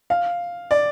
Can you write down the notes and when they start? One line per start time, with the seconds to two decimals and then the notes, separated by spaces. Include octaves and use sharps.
0.10 F5
0.71 D5